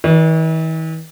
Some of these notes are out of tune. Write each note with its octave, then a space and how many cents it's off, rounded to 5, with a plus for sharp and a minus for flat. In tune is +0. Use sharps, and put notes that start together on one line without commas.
E3 -45 D5 +0